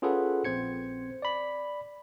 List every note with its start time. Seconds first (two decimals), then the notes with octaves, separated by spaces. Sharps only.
0.02 C#4 F4 G#4 A4 B4 F#5
0.45 A#1 C4 C5 G#6 C#7
1.22 D5 B5